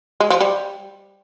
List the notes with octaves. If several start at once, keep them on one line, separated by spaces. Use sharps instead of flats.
G#3
F3
G3